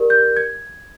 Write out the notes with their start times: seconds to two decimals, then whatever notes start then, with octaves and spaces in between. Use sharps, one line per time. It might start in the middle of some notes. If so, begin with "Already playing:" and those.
Already playing: G4 A#4 D5
0.10 G6
0.37 G#6